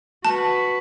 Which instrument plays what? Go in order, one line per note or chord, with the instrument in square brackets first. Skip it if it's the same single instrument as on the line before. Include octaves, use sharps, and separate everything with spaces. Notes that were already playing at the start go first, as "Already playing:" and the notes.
[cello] F#4 B4 [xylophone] A5